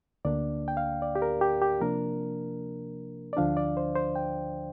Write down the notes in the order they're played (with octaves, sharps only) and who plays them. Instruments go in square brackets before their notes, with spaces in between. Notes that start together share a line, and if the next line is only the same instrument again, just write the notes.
[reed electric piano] D2 D3 A#3 D4 D5
G5
F5
D5
G4
A#4
G4
G4
C3 F3 A#3 D4 A#4
D5
D2 D3 F3 D4 F5
D5
C5
C5
G5